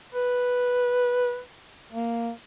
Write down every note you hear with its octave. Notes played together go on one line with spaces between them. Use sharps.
B4
A#3